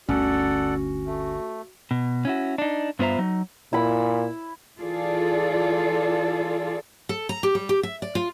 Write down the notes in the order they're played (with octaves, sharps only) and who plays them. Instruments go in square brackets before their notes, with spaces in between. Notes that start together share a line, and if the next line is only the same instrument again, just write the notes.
[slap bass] G1 D2 [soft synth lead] C#4 [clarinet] F#4 [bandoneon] A4 D5 F#5
[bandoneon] A3
[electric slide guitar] B2
C#4 E4 F#4
D4 D#4
G2 B3 F4 C5 E5 A#5
F#3 D#4
[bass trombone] A#2 [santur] E4 B5
[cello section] E3 F4 G#4 A4 D5
[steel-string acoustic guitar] A4
A#5
G4
G3
G4
E5
D5
F4